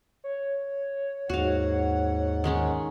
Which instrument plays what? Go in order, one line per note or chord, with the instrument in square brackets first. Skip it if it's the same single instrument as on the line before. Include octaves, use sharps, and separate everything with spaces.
[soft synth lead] C#5
[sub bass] D#2 [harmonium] G#2 F#5 [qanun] F#4 F5
[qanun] D#3 G#3 C#4